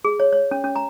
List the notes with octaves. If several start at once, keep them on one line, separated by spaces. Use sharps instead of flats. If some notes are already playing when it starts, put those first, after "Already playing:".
G#4
C#5
C#5
C#4
C#4
A#5